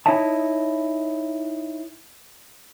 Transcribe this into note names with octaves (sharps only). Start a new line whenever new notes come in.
D#4 E4 C#5 D#5 E5 A5